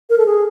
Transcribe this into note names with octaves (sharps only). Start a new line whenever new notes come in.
A#4
A4
G#4